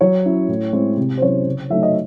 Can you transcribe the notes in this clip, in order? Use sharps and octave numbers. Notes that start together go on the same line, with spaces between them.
F#3 C#5
C#4 E4
A2
G#3 C4 E4
C3
C5
F#3 C#4 E4 C#5
C#3
F#3 A3 D#4 E5
D#5